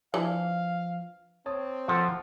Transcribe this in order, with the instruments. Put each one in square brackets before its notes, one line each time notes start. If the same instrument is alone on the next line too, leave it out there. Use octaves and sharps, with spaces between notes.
[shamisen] E3 D4 [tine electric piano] F3 [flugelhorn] F5
[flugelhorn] C4 [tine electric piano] C#5 A5 D#6
[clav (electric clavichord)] F3 A4 [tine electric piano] F#5